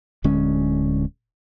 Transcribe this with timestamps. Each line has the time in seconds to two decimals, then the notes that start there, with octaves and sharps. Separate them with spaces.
0.24 D1 D3 G#3 C#4